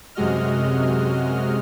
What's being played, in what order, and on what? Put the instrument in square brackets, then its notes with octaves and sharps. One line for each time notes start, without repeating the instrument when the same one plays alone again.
[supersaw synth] F#2 C3 G#3 F#4 D#5 F6